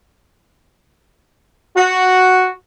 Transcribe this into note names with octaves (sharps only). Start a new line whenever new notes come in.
F#4